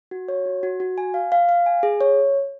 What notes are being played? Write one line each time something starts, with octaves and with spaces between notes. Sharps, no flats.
F#4
C#5
F#4
F#4
F#4
G#5
F5
F5
F5
G#5
G#4
C#5